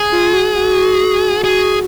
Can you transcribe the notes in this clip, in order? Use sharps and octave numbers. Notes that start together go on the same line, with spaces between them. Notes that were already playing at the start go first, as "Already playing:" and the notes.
Already playing: G#4
F4
F#4
F#4
G#4